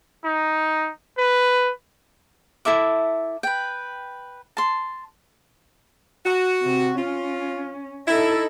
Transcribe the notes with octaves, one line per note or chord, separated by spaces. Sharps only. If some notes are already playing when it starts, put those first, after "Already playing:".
D#4
B4
E4 A4 E5 D6
B4 G5
A5 C6
F#4
C3
C#4 F4
D#4 E4 A4